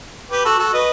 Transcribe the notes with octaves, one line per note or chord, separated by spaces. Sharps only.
G4 B4
F#4 A4
F#4 A4
B4 D#5